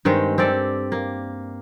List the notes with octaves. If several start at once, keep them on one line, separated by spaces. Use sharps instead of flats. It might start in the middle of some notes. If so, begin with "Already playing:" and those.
G2 D#3 G#3 C4
C4 G4 A4 D5
A#3